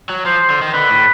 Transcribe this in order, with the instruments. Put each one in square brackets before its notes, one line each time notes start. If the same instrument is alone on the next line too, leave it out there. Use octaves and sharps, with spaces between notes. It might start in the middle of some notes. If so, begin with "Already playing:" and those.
[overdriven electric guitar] F#3
[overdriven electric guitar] F3 [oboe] C5
[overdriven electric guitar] D3
D#3
[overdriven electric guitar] D3 [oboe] B4
[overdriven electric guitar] A2